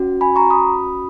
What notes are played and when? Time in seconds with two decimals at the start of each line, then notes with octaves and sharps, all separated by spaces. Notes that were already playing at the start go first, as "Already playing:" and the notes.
Already playing: C#4 F#4
0.21 G#5 B5
0.36 A#5 C#6
0.50 B5 D#6